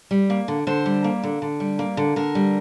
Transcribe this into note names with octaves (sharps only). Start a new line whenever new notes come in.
G3
A#3
D3
D3 C5
G3
A#3
D3
D3
G3
A#3
D3
D3 A#4
G3